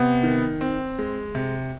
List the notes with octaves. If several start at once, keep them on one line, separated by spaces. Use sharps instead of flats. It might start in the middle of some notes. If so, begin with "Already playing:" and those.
Already playing: C3 B3
D#3
C4
G#3
C3